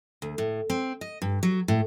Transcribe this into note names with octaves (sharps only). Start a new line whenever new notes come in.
D2
A2
C4
D#5
G2
F#3
A2